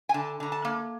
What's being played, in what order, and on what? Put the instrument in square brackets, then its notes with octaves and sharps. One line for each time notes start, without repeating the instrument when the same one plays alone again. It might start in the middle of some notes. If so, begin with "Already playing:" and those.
[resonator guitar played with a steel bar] G#5
D3 A5
D3 A#5
A5
A#3